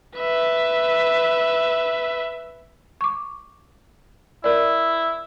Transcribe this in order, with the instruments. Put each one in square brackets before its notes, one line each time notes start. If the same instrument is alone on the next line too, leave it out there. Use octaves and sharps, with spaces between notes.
[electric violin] B4 E5
[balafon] C#6 D6
[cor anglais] E4 [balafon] A#4 D5